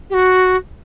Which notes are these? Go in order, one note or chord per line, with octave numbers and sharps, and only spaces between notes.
G4
F#4